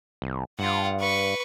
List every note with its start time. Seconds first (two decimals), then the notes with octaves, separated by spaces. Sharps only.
0.22 C2
0.59 G2 F4 F#5
1.00 B4 C#6